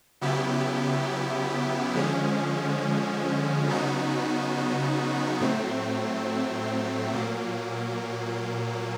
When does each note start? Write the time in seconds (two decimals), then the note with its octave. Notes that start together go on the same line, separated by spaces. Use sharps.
0.21 C#3 F#3 B3 E4 G4
1.94 D3 F3 G#3 C#4
3.67 C#3 F#3 B3 D#4 F#4
5.40 A2 F#3 A3 C4
7.13 A#2 F#3 A#3